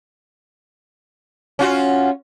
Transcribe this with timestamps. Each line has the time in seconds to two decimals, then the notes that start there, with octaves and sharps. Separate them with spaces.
1.59 C#4 F4 F#4